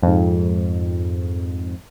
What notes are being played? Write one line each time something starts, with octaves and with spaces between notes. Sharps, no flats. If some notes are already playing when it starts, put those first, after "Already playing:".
F2 G#2